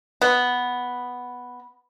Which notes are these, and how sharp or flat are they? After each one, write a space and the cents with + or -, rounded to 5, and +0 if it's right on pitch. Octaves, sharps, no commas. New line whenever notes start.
B3 +0